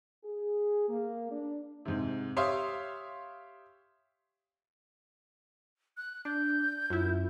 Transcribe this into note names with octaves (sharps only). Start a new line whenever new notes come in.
G#4
A#3
D4
G#2 C3
G4 C#5 E5 F5 C6 D#6
F#6
D4 G6
F#2 E4 F4